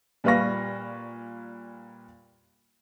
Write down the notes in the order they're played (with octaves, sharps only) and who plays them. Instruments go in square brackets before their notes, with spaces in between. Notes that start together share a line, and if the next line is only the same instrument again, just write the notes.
[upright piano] A#2 G3 B4 F5 C#6 A#6